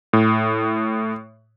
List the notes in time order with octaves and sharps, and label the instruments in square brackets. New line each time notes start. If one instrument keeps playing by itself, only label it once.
[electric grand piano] A2